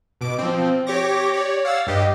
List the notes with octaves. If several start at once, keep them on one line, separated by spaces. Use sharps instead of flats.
B2 D6 D7
F3 C4
G4 C#5 C#6 D6 A#6
C#5 D5
F5 F#5 E6 A6
G2 G4 D#5